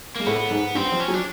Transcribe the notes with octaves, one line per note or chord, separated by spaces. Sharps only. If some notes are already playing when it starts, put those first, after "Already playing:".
G#3 A#3
A2 A3 B3
G#2 G#3
G2 G3 C4
F3
C#4
F#3
D4